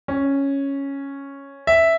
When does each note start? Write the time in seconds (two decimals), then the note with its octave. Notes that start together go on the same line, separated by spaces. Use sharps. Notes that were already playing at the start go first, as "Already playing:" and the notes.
0.08 C#4
1.67 E5